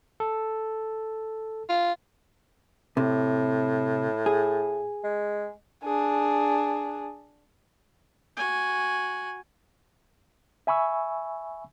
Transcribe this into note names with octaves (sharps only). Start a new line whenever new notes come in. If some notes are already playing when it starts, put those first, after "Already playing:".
A4
F4
A2 C3
G#4
G#3
D4 G#4
F#4 G#5
E5 G#5 B5 C#6 E6